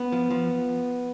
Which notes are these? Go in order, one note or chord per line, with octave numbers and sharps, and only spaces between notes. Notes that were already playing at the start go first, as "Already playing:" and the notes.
Already playing: B3
F3
F3